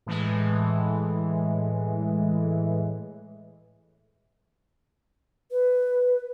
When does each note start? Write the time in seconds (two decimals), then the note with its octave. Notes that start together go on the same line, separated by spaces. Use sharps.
0.06 A2 E3 G#3
5.51 B4